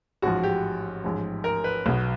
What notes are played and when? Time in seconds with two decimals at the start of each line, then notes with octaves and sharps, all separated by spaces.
0.22 A1 G#2 F3 F#4
0.43 G4
1.04 A1 G#2 F3
1.44 A#4
1.64 B4
1.86 B1 B2